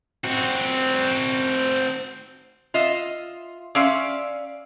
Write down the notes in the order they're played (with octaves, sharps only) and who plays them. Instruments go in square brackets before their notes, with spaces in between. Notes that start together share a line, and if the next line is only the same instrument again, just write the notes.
[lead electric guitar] C4 F#4
[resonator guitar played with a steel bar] F4 D#5 E5
[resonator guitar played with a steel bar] C#4 F5 [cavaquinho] D5 E5 C6